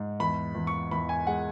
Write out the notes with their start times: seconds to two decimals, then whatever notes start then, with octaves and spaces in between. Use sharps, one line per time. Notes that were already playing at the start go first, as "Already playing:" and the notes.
Already playing: G#2
0.20 E2 B5
0.55 E2
0.67 C#6
0.91 E2 B5
1.09 G#5
1.27 G#3 F#5